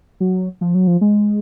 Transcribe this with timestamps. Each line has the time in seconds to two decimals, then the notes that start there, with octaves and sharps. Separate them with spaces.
0.20 F#3
0.61 F3
0.75 F#3
0.87 F3
1.01 G#3